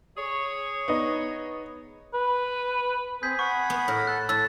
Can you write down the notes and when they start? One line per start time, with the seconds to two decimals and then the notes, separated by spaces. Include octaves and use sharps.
0.18 G#4 C#5
0.88 B3 D#4 D#5
2.14 B4
3.23 C4 G#4 G6 B6
3.39 F#5 B5 C#6
3.70 B3
3.88 A2 A#4
4.07 A4 F#6
4.29 A2 A5 E6